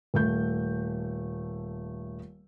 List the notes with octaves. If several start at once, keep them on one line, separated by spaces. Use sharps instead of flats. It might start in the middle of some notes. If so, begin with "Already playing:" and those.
D#1 A3 G6